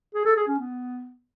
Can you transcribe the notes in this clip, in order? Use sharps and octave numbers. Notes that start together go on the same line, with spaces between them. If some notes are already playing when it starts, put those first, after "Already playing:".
G#4
A4
G#4
C#4
B3